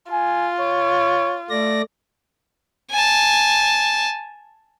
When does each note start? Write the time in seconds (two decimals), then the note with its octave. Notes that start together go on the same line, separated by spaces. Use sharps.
0.12 F4 G#5
0.60 C#5
1.50 A3 D5 A#6
2.91 G#5 A5